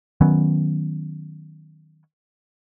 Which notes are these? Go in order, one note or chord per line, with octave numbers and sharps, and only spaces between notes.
D#3 F#3 B3 C#4